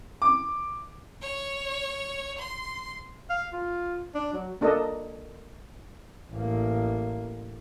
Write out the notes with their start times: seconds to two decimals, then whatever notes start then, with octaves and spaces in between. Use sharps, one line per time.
0.22 D6
1.22 C#5
2.38 C6
3.30 F5
3.53 F4
4.15 D4
4.33 F#3
4.61 A#3 D4 A4 A#4 D#5
6.33 A1 A#3